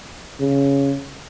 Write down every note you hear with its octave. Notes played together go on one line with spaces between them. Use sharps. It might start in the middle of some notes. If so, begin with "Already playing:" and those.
C#3